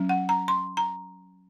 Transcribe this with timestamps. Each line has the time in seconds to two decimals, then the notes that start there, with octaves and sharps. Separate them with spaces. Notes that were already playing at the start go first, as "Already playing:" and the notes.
Already playing: F#3 C#4
0.09 F#5
0.29 A#5
0.48 C6
0.77 A#5